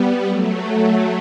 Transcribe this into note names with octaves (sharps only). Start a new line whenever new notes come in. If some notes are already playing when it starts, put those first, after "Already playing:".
Already playing: G3 B3
F#3 A3